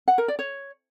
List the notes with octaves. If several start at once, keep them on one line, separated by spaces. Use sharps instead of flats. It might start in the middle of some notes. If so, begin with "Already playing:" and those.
F#5
A#4
D5
C#5